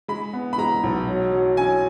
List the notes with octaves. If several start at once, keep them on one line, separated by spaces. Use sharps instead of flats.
G#3 B5
B3
B5
G#3 A#5
B1
F#3
F#3
F#3 G#5